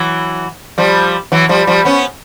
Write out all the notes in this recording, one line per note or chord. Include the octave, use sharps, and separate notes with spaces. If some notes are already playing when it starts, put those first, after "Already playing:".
Already playing: E3 F#3
F3 G3
E3 F#3
F3 G3
F3 G3
B3 C#4